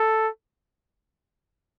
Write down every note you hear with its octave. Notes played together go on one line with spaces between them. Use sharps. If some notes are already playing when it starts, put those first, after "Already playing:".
Already playing: A4